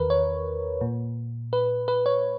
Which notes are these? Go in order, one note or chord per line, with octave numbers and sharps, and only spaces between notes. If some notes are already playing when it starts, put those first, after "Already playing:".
Already playing: E2 D#3 A#4 B4
C#5
A#2
B4
B4
C#5